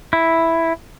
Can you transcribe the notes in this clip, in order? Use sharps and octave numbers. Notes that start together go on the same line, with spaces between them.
E4